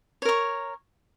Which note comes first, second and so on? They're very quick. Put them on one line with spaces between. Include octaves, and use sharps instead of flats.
C#5 A#4 C#6